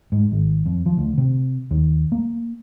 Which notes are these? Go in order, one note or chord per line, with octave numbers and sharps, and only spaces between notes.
G#2
G#1
F2
F3
D2
C3
D#2
A#3